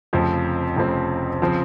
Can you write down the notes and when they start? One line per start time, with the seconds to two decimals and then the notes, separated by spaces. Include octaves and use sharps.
0.13 F1 F2 C#3 F3 C4
0.76 F1 F2 C#3 F3 C4
1.42 C#3 F3 C4